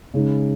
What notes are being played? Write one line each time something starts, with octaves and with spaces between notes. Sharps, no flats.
C#3 G#3 D#4